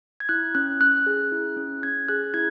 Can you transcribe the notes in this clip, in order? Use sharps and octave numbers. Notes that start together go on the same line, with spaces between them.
G#6
E4 F#6
C#4 F#6
C#4 F#6
G#4
E4
C#4
C#4 G#6
G#4 F#6
E4 G#6